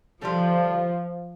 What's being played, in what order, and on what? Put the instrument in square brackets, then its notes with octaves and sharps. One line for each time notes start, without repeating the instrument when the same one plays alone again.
[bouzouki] D3 G3 D4 F4 [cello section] F3